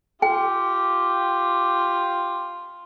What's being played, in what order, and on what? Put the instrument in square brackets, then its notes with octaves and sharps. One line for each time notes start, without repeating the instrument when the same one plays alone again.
[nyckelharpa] F4 [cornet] G4 [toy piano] G5